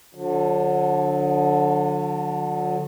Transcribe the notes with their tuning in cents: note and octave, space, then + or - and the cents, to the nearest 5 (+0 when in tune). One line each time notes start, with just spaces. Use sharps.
D3 +0 F#3 -45